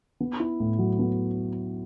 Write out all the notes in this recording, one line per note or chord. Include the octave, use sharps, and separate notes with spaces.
B3
E4
A2
F#3
B3